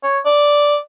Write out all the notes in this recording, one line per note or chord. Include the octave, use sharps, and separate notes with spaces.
C#5
D5